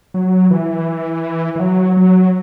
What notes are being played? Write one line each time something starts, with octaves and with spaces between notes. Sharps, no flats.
F#3
E3
E3
F#3
F#3